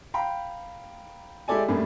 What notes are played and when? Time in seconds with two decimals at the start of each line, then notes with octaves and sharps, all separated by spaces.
0.14 F5 G5 A#5 B5
1.48 G#3 E4 G4 A4 D5 G#5
1.68 F#2 A2 G3 A3 A#3 D4